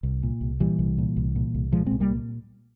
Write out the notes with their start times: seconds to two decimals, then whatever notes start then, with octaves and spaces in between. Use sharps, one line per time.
0.03 C2
0.23 A#2
0.41 C2
0.60 A#2 E3 G3
0.79 C2
0.98 A#2
1.16 C2
1.36 A#2
1.54 C2
1.72 A#2 F3 G#3
1.86 C2 G#3 C4
2.00 G3 A#3
2.10 A#2